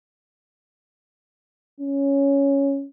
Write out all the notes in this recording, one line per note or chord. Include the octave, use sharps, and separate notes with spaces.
C#4